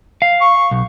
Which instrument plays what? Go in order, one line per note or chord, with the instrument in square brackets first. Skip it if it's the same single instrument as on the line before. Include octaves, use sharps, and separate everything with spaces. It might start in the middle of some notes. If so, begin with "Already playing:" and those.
[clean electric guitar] F5
[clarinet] C#6
[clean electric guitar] B1